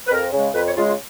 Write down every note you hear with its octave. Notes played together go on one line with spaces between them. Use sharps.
B4
F2 A#4
C#3 G#3
F2 B4
C#5
C#3 G#3 F4
F4